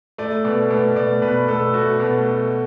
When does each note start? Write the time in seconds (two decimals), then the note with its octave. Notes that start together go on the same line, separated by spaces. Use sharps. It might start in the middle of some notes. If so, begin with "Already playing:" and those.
0.18 A3 D5
0.45 B2
0.70 B2
0.96 B2 D5
1.22 B2 B4
1.48 B2 A4
1.73 A3 F#4
2.00 B2
2.25 A3